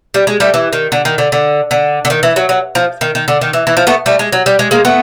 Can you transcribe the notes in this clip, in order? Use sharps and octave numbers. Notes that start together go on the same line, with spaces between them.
G3
G#3
G3 A3
E3
D#3
D3
D#3
D3
D3
D3
D3
D#3
E3
F#3
F#3
F3
D#3
D#3
D3
D#3
E3
E3
F3
A3 B3
G3 A3
G#3
F#3
G3
G#3
G#3 A#3
A3 B3